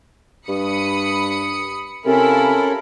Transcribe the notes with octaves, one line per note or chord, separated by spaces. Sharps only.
G2 B5 D#6 C#7
C3 C#4 E4 F4 A4 A#4 B5